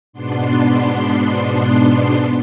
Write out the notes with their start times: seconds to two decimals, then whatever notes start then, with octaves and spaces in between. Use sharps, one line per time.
0.13 G#2 B2 B3 D4 C6